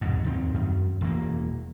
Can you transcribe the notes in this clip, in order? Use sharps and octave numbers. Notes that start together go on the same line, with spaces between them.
C2 F2 G#2
D#2 D#3 C4
F#2
E1 E3 A#3